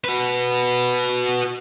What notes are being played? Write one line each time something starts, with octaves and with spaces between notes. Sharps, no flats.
F#4 B4